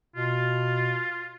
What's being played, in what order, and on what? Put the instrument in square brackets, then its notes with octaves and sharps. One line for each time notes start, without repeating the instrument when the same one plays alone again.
[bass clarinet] B2 [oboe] F4